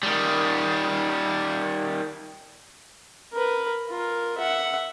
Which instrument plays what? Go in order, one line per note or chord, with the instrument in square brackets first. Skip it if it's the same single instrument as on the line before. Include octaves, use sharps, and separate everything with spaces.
[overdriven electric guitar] D#3 G3
[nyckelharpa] A#4 B4
F4 A#4
E5 F#5